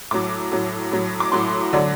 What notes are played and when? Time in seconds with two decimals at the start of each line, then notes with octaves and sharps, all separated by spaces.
0.11 A2 F#3 D6
0.52 A2 F#3
0.92 A2 F#3
1.20 D6
1.32 A2 F#3 C6
1.73 D3 F#3 D5